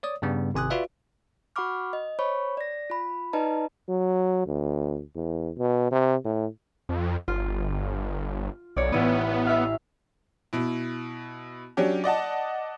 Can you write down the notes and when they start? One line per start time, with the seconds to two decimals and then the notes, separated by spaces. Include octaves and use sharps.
0.03 C#5 D5 D#6
0.22 G2 C#3 G3 B3
0.54 G#1 C3 G#5 D#6 F#6
0.70 F4 F#4 B4 D5 E5 F5
1.56 F#4 F#5 B5 C#6 D6 F6
1.93 D#5
2.19 C5 C#5 B5 C#6
2.57 D5 A#6
2.90 F4 B5
3.33 D#4 B4 D5 D#5 A5 A#5
3.89 F#3
4.47 D2
5.16 E2
5.58 B2
5.91 C3
6.25 A2
6.89 F2
7.28 G1 F4
8.76 B1 C#5 D5
8.92 A1 B3 E4 D#7
9.46 E5 F5
10.53 B2 E4
11.77 F#3 C#4 D4 G4
12.04 D5 D#5 F#5 A5